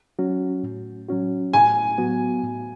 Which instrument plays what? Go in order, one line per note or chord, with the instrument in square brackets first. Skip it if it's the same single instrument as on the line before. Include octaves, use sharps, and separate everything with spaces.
[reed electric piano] F#3 C#4 F#4
A2
F#3 C#4 F#4
[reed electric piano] A2 [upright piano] G#5
[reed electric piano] F#3 B3 F#4
A2